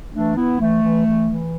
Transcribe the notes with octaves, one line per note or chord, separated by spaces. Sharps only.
E3 A3 D4
E3 B3 E4
E3 A3
E3
E3
E3